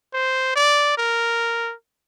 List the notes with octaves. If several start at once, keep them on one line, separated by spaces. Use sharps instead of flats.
C5
D5
A#4